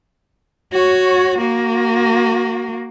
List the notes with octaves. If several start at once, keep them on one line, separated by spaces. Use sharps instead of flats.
F#4 C#5
A#3 F#4